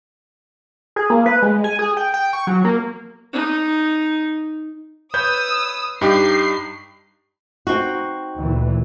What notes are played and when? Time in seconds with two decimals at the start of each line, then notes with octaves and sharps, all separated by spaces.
0.96 G#4
1.10 A#3
1.26 B4
1.42 G#3
1.64 G#5
1.79 G#4
1.97 G5
2.14 G5
2.33 C#6
2.47 F#3
2.65 A#3
3.33 D#4
5.14 B4 C#5 D#6 E6 G6
6.01 G2 D#4 G4 C7
7.67 C4 D#4 F#4
8.37 D2 A#2 E3